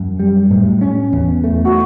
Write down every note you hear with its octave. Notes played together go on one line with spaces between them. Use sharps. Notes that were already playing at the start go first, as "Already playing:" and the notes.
Already playing: F#2
G3
A2
C#4
E2
A3
F#4